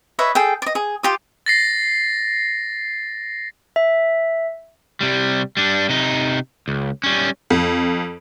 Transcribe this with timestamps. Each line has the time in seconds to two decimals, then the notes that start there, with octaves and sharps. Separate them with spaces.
0.19 B4 C#5 D#5 E5
0.35 G#4 A4 G5
0.62 D5 D#5
0.75 G#4
1.03 F4 G4 D#6
1.46 A6 A#6 C7
3.76 E5
5.01 C3 G3
5.57 G3 D4
5.89 C3 D#4
6.68 C#2
7.03 G3 C#4
7.50 F2